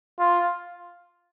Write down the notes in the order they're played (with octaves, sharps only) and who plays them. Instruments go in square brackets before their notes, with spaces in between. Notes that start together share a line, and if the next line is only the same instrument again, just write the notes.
[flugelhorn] F4